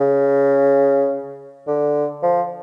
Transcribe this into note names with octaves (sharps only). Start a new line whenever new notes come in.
C#3
D3
F3